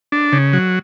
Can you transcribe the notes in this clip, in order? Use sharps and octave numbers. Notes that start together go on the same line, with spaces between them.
D4
C#3
F#3